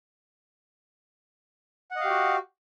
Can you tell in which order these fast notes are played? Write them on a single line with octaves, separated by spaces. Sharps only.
F#5 D#5 F5 G4 F#4